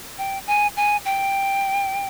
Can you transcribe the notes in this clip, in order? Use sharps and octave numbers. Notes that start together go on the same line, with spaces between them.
G5
G#5
G#5
G5